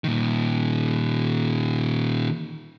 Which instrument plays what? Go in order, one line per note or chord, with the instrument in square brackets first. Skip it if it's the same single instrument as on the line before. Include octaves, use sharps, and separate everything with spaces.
[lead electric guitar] A#2 D#3